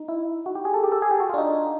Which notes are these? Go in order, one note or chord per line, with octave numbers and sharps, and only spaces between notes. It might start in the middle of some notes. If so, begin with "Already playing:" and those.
Already playing: D#4
E4
F#4
G4
G#4
A4
G4
A4
G#4
G4
F#4
F4
D4
D#4